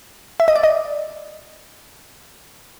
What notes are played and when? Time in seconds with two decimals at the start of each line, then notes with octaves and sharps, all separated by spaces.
0.40 E5
0.48 D#5
0.56 D5
0.64 D#5